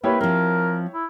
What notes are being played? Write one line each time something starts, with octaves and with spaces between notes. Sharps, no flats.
A#3 E4 G4 B4 C#5
F3 C4 A#4
E4